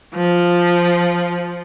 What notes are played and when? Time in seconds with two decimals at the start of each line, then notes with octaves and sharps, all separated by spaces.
0.15 F3